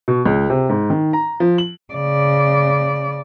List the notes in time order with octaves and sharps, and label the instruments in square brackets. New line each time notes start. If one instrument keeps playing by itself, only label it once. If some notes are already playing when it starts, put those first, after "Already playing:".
[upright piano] B2
C#2
C3
G#2
D#3
A#5
F3
F#7
[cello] C#3 D5